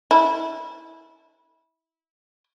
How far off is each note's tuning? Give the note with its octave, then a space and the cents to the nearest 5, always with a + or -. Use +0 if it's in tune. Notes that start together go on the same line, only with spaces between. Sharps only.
E4 -20